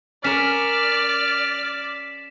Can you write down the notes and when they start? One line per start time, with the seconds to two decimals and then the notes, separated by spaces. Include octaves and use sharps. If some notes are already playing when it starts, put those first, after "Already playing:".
0.24 C#4 A#4 D5 F6 B6 E7